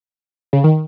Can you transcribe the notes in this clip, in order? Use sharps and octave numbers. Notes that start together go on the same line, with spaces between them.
C#3
D#3